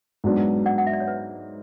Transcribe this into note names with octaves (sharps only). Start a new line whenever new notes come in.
G#2 F#3 B3 D4
D5 F#5
F#5
E5
D5
C#5
B4